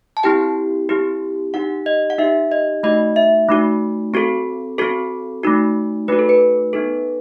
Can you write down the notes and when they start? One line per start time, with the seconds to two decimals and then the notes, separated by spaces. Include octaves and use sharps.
0.17 A5
0.23 C4 E4 G4 G5
0.89 C4 E4 G4
1.54 D#4 G4 F#5
1.86 D#5
2.10 F#5
2.18 D#4 G4 E5
2.52 D#5
2.83 A3 D#4 F#4 D#5
3.16 E5
3.48 A3 D#4 F#4
4.14 C4 F#4 A4
4.78 C4 F#4 A4
5.43 A3 D#4 F#4
6.08 A3 D#4 F#4 B4
6.19 A4
6.29 B4
6.73 B3 D#4 A4